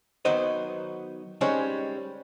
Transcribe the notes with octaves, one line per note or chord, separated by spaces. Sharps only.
D#3 F#3 B3 D#4 C5 D#5
G3 G#3 C#4 D#4 C5 C#5